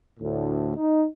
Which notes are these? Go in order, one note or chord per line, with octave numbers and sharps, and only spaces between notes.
D2 A2
D#4